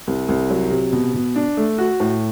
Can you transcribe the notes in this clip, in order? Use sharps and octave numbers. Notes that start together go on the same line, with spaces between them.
C2
C2
F#3
C3
B2
B2
D4
A3
F#4
A2